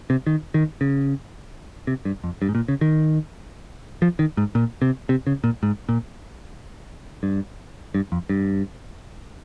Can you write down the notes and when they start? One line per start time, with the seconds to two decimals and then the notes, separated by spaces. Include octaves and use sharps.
0.10 C3
0.27 D#3
0.54 D#3
0.81 C#3
1.87 C3
2.05 G2
2.24 F2
2.42 G2
2.49 G#2
2.55 A#2
2.68 C#3
2.81 D#3
4.02 F3
4.19 D#3
4.37 G#2
4.55 A#2
4.82 C3
5.09 C3
5.27 C#3
5.44 A#2
5.63 G#2
5.89 A#2
7.23 G2
7.94 G2
8.12 F2
8.29 G2